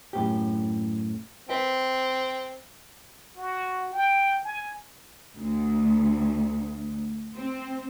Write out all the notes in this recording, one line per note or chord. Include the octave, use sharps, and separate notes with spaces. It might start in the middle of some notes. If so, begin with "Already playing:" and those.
F#2 A2 G4
C4 B4 E5 G5
F#4
G5
G#5
D2
C4